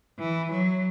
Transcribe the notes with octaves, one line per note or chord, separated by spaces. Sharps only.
E3
F#3